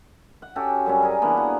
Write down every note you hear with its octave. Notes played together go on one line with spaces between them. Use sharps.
F#5
C#4 F#4 G4 A4
F#2 G3 C#4
G#4 A#4 F5
E3 A#3 B3 D4
F#4